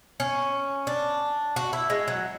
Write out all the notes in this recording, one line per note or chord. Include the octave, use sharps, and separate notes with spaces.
C#4
D4
F#4
E4
G#3
F#3